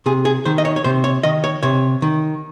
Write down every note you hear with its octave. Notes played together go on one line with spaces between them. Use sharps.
C3 G#4
G#4
D#3 C5
D#5
C#5
C#5
C3 C5
C#5
D#3 D#5
C#5
C3 C#5
D#3